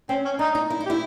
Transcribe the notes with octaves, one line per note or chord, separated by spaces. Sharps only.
C4 C#4
C#4
D4 D#4
D#4
E4
D#4
G4
E4